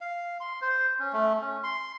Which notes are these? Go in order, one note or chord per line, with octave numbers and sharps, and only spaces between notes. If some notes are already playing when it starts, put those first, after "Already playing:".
F5
C6
C5
C#4
A3
C#4
C6